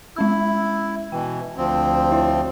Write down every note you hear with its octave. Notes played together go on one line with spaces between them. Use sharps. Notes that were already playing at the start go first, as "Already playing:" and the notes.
G#3 C#4 E4 E6
B2 E3 G5
D2 F3 C4
E4 C#5 E5